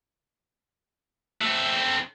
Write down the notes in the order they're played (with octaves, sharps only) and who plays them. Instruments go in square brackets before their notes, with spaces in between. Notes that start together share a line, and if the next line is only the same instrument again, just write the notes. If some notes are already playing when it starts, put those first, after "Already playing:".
[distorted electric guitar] A3 C4